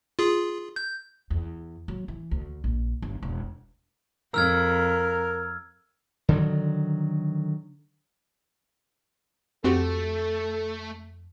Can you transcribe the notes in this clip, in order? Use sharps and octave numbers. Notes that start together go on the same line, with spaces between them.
F4 G#4
G6
E2
F#3
E3
D2
A#1
G1
E1
F2 A#4 E6 F6 G#6
D3 D#3 F#3
F2 A3 C4 F#4 G4 A4